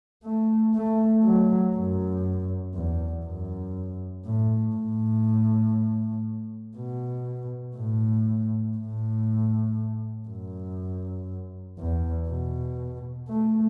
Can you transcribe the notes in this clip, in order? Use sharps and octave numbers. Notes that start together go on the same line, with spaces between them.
A3
A3
F#3
F#2
E2
F#2
A2
A2
B2
A2
A2
F#2
E2
B2
A3